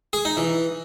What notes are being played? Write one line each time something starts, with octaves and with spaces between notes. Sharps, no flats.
G#4
D#4
E3